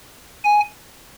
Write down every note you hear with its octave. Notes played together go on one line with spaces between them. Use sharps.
G#5